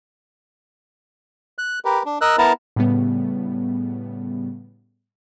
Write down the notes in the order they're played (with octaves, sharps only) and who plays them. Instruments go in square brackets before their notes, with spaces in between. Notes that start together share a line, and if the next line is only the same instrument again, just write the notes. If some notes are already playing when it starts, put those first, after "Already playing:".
[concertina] F#6
G4 A#4 B4
D4
A#4 D#5 E6 F#6
B3 E4 A#4 A5 A#5
[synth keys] A2 C#3 G3 B3